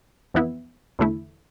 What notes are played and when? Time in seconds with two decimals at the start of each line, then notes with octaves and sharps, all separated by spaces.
0.34 F2 E3 B3 E4
0.99 E2 D3 A3 E4